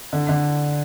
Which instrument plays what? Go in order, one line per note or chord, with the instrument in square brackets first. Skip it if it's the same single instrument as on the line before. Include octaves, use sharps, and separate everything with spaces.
[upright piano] D3
D3